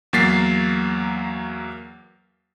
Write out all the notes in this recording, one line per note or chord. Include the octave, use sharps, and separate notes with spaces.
E2 F#3 A#3 A6 B6 C7